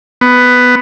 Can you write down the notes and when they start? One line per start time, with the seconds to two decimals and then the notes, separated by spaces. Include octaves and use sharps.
0.21 B3